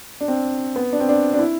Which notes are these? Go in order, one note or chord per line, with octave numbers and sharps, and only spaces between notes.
D4
C4
B3
D4
C4
D4
D4
E4